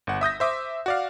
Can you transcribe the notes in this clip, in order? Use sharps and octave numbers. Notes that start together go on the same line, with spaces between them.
G1 F#5
E5 D#6 G6 A#6
C5 E5 D6 D#6
F#4 D5 F5